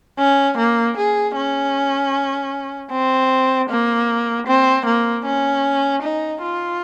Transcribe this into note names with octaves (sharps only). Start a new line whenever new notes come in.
C#4
A#3
G#4
C#4
C4
A#3
C4
A#3
C#4
D#4
F4